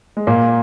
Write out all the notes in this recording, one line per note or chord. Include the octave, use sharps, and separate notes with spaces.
G#3
A#2 A#3